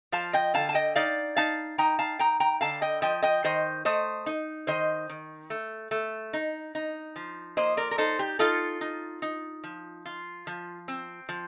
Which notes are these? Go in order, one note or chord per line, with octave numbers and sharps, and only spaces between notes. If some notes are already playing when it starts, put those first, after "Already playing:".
F3 F5 A5
D#5 G5
D3 F5 A5
A5
D#5 G5
D#4 D5 F5
D#4 F5 A5
D#4 G5 A#5
F5 A5
D#4 G5 A#5
G5 A#5
D3 F5 A5
D#5 G5
F3 D#5 G5
D#5 G5
D#3 C5 D#5
A3 C5 D#5
D#4
D#3 C5 D#5
D#3
A3
A3
D#4
D#4
F3
A#3 C5 D#5
A#4 D5
A#4
D#4 A4 C5
G4
D#4 F4 A4
D#4
D#4
F3
F4
F3
C4
F3